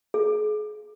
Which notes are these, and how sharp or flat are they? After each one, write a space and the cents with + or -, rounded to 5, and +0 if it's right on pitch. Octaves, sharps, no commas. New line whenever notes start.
G#4 +35